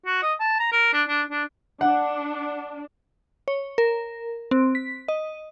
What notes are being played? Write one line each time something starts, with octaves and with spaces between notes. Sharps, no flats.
F#4
D#5
A5
A#5
A#4
D4
D4
D4
D4 F#5
C#5
A#4
C4
B6
D#5